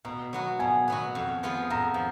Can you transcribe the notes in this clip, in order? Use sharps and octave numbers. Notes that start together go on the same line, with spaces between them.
B2 A#5
F#3 B3 F#4
B2 G#5
F#3 B3 F#4
F2
F3 B3 F4 G#4
F2 A#5
F3